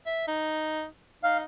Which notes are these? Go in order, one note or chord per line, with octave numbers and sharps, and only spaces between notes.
E5
D#4
D#4 F5